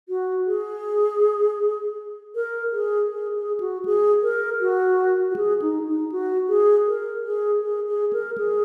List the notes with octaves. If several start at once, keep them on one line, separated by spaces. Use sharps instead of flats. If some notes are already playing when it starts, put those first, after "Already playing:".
F#4
G#4
A#4
G#4
G#4
G#4
F#4
G#4
A#4
F#4
F#4
G#4
D#4
D#4
F#4
G#4
A#4
G#4
G#4
G#4
A#4
G#4